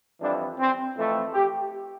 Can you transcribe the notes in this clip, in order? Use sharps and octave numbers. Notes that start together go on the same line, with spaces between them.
F2 E3 G3 D4
C4
F2 E3 A3
G4